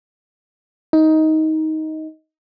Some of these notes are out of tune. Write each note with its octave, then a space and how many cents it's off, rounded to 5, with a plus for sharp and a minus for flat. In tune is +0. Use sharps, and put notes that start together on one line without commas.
D#4 +15